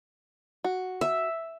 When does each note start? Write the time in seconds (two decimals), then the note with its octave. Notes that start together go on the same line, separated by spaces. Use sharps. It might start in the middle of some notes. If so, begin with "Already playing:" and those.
0.64 F#4
1.01 E5